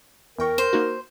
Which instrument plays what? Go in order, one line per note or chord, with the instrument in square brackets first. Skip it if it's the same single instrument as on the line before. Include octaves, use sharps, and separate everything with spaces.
[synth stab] E2 G5 C#6 [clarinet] A#4
[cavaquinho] C5
[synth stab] A#3 D#4 F#4